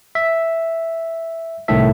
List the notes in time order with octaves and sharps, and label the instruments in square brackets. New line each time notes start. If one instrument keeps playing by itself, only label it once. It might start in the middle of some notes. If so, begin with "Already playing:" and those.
[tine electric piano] E5
C2 A2 D#3 A4 E5